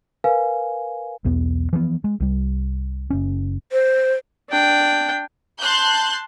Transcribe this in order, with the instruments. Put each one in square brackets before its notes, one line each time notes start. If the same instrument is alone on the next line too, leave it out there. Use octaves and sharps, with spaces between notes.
[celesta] A#4 B4 F5 G#5
[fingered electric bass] B1 E2 B3
E3 F3 G#3 B3
G#3
C2 G3
F#1 C#4
[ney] C5
[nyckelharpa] D4 G5
[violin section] A5 C6 F#6 G6